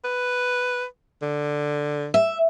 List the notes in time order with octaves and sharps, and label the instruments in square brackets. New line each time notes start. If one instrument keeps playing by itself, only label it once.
[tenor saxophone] B4
D3
[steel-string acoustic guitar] E5